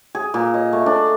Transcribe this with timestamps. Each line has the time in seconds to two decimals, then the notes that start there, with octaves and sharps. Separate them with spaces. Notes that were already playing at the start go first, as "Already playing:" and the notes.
0.15 G#4
0.34 A#2
0.54 D#5
0.73 A3
0.86 D4